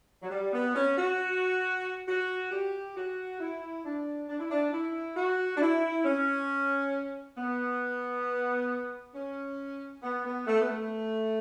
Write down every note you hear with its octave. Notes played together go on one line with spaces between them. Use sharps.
F#3
G3
B3
C#4
F#4
F#4
G4
F#4
E4
D4
D4
E4
D4
E4
F#4
D4
E4
C#4
B3
C#4
B3
B3
A3
B3
A3